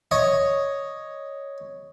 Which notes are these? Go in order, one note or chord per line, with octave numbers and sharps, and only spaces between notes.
C#5 D#5